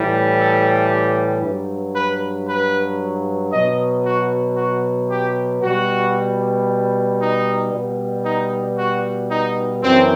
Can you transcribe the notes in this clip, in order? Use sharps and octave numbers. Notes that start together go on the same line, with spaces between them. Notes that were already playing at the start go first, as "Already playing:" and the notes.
Already playing: A2 E3 G3
A4
G4
G2 F#3
B4
B4
B2 F#3 D#5
F#4
F#4
G4
B2 G3 F#4
D#4
B2 G3
D#4
F#4
D#4
F#2 E3 C4